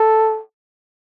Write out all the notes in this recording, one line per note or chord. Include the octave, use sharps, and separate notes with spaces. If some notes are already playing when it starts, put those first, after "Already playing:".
Already playing: A4